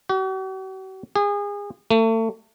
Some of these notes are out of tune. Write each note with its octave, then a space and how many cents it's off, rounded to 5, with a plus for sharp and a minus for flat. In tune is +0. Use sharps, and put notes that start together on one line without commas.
F#4 +45
G#4 -30
A3 +35